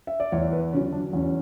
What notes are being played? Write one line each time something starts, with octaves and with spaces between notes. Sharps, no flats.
E5
D5
E2 C#5
B4
D3 F#3 C#4
D4
E2 C#4